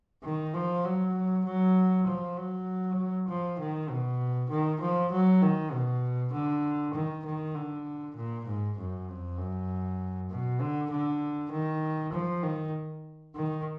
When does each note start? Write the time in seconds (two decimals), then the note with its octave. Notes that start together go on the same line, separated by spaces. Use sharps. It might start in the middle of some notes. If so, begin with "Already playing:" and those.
0.24 D#3
0.54 F3
0.85 F#3
1.45 F#3
2.07 F3
2.37 F#3
3.28 F3
3.59 D#3
3.90 B2
4.50 D#3
4.81 F3
5.12 F#3
5.42 D#3
5.72 B2
6.33 D3
6.94 D#3
7.25 D#3
7.55 D3
8.16 A#2
8.46 G#2
8.78 F#2
9.09 F2
9.38 F#2
10.30 B2
10.61 D3
10.90 D3
11.51 D#3
12.13 F3
12.43 D#3
13.35 D#3